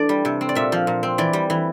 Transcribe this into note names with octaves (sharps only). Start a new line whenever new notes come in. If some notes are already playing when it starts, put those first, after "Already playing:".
Already playing: E3 A3 D4 D5
G3
C3
C4
D5
A#2 E5
F3
A#2
C4
E3 D5
G3
E3